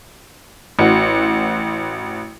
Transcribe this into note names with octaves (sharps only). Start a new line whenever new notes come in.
A1 F#4